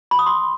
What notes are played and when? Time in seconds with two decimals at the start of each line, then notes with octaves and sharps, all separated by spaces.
0.11 B5
0.19 D#6
0.26 C6